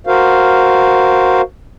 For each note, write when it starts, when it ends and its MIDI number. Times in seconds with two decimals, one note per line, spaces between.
0.07 1.41 66
0.07 1.41 70
0.07 1.41 72
0.07 1.41 77